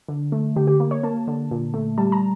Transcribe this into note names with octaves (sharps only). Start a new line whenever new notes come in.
D3
A3
D3 G4
G4
A#3
C#5
A#3 A5
D3
A#2
A3
G3 A5
A#5